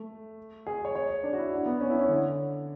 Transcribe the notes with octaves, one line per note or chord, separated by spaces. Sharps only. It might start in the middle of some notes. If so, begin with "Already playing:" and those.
Already playing: A3
G#4
C#5
C#5
D4
F#4
E4
D4
B3
C#4
E4
C#4
D3